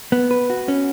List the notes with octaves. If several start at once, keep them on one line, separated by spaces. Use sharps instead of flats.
B3
B4
F#4
C#4